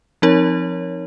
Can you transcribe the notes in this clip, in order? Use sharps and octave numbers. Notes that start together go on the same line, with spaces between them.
F3 C4 D#4 A#4 C#5